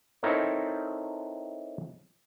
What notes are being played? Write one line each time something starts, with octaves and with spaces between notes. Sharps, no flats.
C4 D#4 E4 A4 A#4 C#5